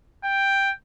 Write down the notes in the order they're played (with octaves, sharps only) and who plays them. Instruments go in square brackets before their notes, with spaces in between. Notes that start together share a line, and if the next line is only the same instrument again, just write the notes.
[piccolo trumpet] G5